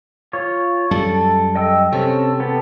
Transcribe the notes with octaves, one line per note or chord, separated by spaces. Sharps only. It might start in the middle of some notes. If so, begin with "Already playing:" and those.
F4 C#5
F#2 G3 A4
D#5 G5 E6
C3 C4 C#4 A4
B3 G4 A4